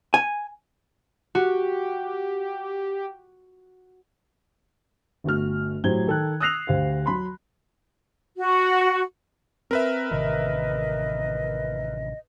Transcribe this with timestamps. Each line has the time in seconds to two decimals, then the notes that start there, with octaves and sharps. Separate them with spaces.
0.14 G#5
1.35 F#4 G4
5.24 G1 A3 F#4 F6
5.84 A2 F#3 G4 C5 G#6 G7
6.07 D#3 A4 G5 F#6
6.40 D#6 E6 F#6 A#6 C7 F7
6.67 D2 G4 C5 F5
7.06 F#3 B5 C6
8.36 F#4
9.71 C4 A#4 B4 E5
10.11 A1 C3 D#3 D#5